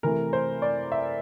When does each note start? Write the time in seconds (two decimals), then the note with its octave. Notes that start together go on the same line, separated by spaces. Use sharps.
0.03 C3 E3 A3 A#4
0.33 C5
0.62 D5
0.92 E5